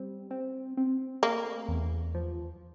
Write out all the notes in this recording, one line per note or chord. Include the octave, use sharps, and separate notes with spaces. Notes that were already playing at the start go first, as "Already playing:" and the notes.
Already playing: G3 C4
C4
C4
A3 A#3
E2
F3